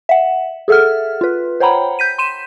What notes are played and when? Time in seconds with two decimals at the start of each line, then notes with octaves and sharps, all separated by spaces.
0.09 E5 F#5
0.68 G#4 A4 E5 F#5 F6
1.21 F4 B4
1.60 C5 C#5 F#5 G5 A#5 B5
1.99 G6 B6 D#7
2.18 C6 D#7 E7